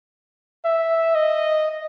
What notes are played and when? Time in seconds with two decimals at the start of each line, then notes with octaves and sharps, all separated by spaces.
0.65 E5
1.15 D#5